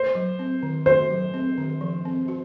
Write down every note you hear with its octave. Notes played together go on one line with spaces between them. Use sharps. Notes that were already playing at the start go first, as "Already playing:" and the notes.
Already playing: C5
F#3
C4
D#3
F#4 C5
F#3
C4
D#3
F3
C4
F#4